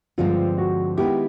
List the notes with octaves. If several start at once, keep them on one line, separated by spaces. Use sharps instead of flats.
G2 D3 F3 G#3 C4 F4
F#4
D#3 G#3 B3 E4 G4